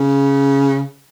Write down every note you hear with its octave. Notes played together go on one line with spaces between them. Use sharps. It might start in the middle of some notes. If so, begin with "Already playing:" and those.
Already playing: C#3